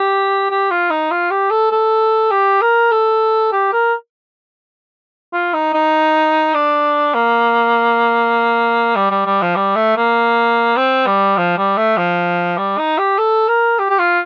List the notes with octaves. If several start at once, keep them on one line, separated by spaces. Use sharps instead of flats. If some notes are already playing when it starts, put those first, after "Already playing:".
Already playing: G4
G4
F4
D#4
F4
G4
A4
A4
G4
A#4
A4
G4
A#4
F4
D#4
D#4
D4
A#3
G3
G3
G3
F3
G3
A3
A#3
C4
G3
F3
G3
A3
F3
G3
D#4
G4
A4
A#4
G4
G4
F4